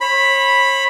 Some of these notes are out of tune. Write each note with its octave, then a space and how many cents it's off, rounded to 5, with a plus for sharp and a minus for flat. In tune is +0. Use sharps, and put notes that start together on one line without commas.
C#5 -40 B5 +0